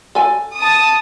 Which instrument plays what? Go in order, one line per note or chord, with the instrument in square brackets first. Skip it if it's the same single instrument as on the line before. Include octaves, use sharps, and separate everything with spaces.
[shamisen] A4 G#5
[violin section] A5 D#6